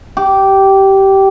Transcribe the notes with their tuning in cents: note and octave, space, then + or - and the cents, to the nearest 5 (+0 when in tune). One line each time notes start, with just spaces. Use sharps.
G4 -15